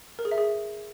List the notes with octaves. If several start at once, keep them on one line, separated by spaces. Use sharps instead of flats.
A#4
G#4
E5
G#4